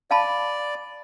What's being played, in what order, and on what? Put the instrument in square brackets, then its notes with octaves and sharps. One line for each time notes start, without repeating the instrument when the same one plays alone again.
[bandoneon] D5 [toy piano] F5 A5 B5